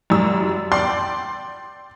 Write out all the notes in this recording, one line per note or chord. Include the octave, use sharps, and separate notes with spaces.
F#2 G3 E6
D5 G5 C6